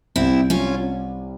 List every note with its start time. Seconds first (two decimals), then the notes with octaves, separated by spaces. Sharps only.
0.16 C2 C3 G3 C4 E4
0.50 C#4 F4